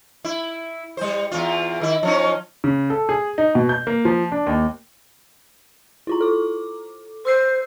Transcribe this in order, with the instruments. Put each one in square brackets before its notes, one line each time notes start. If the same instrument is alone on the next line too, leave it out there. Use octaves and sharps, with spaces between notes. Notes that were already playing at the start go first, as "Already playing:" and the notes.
[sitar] E4
G3 C5
E2 F4
D#3 E4
F3 C#4 D#4
[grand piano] C#3
A4
G#4
D#4
B2
G6
A#3
F3
D4
D#2
[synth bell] E4 F4 A#5
A4 D6
[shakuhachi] C5 [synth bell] C6 E6 C7